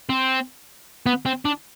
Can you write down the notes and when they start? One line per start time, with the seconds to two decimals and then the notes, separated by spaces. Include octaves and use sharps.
0.09 C4
1.06 B3
1.26 C4
1.45 D4